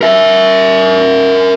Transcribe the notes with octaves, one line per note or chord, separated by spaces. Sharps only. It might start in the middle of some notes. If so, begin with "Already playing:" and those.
A#4 E5